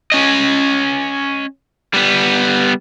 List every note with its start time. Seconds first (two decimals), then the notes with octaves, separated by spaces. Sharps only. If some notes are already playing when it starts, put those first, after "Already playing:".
0.12 C#4 D#5
1.94 G3 B3